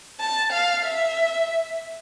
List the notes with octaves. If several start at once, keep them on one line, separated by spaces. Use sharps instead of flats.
A5
F5
E5